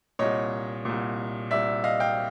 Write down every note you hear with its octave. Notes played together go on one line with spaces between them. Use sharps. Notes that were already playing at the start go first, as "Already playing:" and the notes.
C2 A#2 C#5 D#5
C2 A#2
C2 A#2 D5 E5
D#5 F5
F5 G5